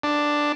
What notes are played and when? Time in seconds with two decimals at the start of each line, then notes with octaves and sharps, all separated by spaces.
0.03 D4